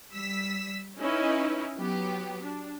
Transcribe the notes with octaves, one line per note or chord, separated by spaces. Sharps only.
G3 E6 B6
C#4 D#4 E4 B4 D#5
F#3 B3 G4
D4